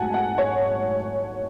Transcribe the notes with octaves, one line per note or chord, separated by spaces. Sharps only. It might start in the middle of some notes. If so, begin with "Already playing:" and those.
Already playing: G#2 F#3 A3 F#5 G#5 A5
F#5
C#5